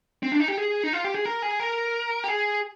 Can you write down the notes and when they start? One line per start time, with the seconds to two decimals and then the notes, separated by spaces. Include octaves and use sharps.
0.23 C4
0.32 D4
0.40 D#4
0.48 G4
0.58 G#4
0.83 D#4
0.93 F4
1.04 G4
1.14 G#4
1.26 A#4
1.42 G#4
1.60 A#4
2.24 G4
2.28 G#4